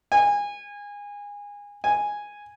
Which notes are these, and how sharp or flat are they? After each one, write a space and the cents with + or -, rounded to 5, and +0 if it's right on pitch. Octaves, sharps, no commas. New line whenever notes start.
G#5 -25
G#5 -5